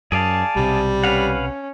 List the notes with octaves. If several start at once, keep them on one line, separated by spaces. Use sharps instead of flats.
F#2 G#4 D5 F5 A5
B1 C3 G3
C#4 B4 F5 F#5